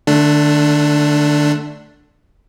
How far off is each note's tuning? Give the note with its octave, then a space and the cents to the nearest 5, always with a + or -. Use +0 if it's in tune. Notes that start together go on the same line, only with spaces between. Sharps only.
D3 +35 A3 +0 D4 +0